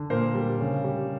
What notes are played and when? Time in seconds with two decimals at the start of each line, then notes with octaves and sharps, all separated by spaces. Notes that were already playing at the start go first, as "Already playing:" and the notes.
Already playing: D3
0.10 A#2 A#4 C5
0.35 G3
0.60 C#3
0.84 G3